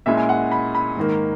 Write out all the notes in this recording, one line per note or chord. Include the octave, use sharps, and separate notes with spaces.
A#2 G#3 C#4 E4 E5
G#5
F#5
B5
B5
G#2 D#3 A#3